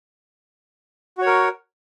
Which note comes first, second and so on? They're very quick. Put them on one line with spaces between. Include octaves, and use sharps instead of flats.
F#4 C#5 A#4